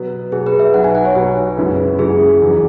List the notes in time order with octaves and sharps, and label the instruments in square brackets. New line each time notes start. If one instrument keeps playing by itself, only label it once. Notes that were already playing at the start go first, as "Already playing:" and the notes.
Already playing: [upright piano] B2 F#3 B3
[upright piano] B2 F#3 B3 [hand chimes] G#4
[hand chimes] B4
E5
[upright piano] B1 B2 F#3 B3 [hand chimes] F#5
[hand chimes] G#5
F#5
C#5
[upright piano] B1 B2 F#3 B3 [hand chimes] B4
[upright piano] F#2 C#3 G#3 E4
[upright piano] F#2 C#3 G#3 E4 [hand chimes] G#4
[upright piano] E1 E2 C#3 F#3